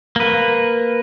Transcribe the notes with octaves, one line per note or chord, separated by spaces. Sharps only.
A#3 B4